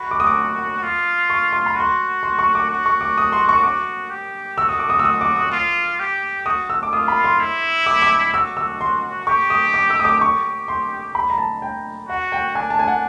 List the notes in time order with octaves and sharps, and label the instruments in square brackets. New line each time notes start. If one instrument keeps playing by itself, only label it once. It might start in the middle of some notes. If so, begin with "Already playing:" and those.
Already playing: [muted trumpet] F#4 [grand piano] B5
[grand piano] D6
D#6
D6
[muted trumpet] F4
[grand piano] C#6
C6
B5
[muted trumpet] F#4 [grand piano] C6
[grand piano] C6
C#6
D6
[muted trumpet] F#4
[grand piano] C#6
D6
D#6
C6
C#6
[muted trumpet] F#4 [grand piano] D6
[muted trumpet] G4
[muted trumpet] F#4 [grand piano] E6
[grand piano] D#6
D6
D#6
E6
D#6
D6
D#6
[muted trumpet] F4
G4
[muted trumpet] F#4 [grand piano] D#6
[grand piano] E6
D6
[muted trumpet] F4 [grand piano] D#6
[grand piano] B5
C6
[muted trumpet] E4
[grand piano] D6
D6
[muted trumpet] F#4 [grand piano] E6
[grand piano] E6
C6
[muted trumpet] G4 [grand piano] C#6
[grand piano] D#6
D6
E6
D#6
D6
[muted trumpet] G4 [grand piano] C#6
[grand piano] C6
B5
A#5
A5
G5
[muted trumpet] F#4 [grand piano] F#5
[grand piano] G5
[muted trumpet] D4 [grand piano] G#5
[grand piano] A5
G#5
F#5